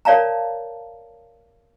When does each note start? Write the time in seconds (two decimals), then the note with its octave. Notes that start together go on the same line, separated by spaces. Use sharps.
0.05 A#4 C#5 D5 F5 A5 A#5